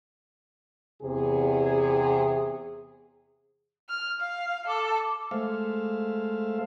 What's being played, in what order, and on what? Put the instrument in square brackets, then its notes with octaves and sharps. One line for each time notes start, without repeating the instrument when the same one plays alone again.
[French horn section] E2 C3 G#4
[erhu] F6
F5
[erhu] A4 [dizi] D6
[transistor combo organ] G#3 A3 C5 E5 F5